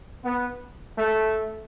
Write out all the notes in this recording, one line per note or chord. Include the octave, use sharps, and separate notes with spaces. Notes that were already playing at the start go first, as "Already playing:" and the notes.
B3
A3